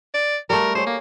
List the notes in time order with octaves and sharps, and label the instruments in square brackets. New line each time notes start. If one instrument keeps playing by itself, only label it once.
[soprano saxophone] D5
[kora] G3 A3 [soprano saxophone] A#4
[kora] G#4 C#5 [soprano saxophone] C5
[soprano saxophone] A#3